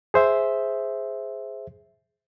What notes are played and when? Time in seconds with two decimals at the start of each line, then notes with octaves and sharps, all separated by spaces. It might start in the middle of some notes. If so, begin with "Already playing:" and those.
0.14 G#4 C5 E5